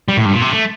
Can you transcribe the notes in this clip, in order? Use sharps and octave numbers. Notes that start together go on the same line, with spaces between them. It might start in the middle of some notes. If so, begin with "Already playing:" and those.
G3
A2
G2
A#2
C3
A3